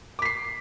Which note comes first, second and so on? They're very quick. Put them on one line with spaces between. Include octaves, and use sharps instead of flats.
D6 B6 C7